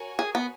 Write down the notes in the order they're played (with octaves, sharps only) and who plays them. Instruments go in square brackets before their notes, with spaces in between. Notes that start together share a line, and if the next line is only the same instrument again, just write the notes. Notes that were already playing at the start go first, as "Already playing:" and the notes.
Already playing: [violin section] F#4 A#4 C#5 G#5
[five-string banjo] G#4
B3